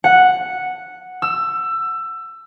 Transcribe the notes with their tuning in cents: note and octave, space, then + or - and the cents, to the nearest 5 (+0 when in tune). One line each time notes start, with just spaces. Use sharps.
F#5 -5
E6 +20